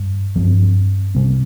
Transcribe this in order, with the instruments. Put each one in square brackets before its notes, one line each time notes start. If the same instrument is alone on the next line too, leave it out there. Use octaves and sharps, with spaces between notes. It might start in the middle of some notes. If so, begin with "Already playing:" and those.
Already playing: [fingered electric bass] G2
G2 F3 C4
C3 G3 C4